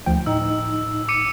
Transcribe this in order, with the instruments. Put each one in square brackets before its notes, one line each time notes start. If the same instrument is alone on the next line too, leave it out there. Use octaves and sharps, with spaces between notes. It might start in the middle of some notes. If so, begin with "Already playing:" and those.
[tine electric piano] D2 F3 G5
[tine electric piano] A2 D#4 [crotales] E6
[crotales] D6 C#7 D#7